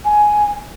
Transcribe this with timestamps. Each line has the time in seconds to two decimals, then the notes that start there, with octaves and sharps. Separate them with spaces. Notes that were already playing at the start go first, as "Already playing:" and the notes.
0.05 G#5